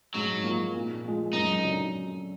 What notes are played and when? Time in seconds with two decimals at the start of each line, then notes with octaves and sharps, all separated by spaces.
0.14 G#2 F#3
0.44 F3 A#3
0.74 A#2
1.04 F3 G#3
1.33 F#2 D#4
1.63 D3 F#3